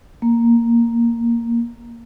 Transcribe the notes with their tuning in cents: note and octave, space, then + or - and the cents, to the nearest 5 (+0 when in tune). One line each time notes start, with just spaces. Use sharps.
A#3 +0